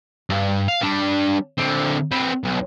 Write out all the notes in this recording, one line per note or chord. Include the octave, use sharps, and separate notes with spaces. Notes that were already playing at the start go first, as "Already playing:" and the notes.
G2
F5
G3 D4
D3 C4
C4 B4
B1